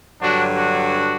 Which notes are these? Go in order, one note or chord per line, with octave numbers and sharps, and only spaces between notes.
G2 D3 F#3 D4 F#4
D4 F#4